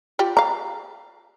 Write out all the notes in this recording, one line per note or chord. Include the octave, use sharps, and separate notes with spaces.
F4 G4
F5 A#5